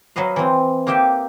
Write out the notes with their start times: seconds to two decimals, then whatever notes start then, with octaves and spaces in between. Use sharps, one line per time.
0.16 F#3 B4 D#5 F5
0.36 E3 C4
0.87 A#3 D#4 G4 E5 G5